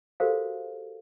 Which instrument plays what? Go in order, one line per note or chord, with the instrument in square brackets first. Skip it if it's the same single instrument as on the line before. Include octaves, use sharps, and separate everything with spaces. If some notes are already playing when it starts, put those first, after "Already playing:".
[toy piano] F#4 G4 A4 A#4 C5 F5